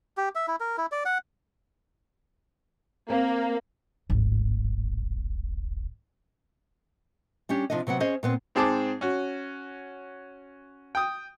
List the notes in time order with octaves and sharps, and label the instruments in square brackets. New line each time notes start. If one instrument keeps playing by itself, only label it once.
[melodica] G4
E5
E4
A#4
E4
D5
F#5
[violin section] A#3 [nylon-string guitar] C4
[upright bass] D1 G#1
[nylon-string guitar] G3 C#4 D4 G4
C3 F3 D4 D#4 D#5
C3 F#3 B3 F#5
C#4 G#4 C5 D#5
A#2 B3 C4
[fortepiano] G#2 C4 G#4 A5 D6
C#4 F#4
G5 D#6